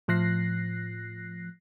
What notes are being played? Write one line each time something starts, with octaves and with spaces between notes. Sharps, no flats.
A2 F3 F#6 A#6 C7